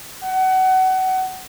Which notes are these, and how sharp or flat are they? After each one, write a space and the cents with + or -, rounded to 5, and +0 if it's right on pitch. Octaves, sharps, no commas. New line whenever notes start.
F#5 +25